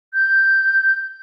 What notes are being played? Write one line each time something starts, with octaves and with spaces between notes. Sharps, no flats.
G6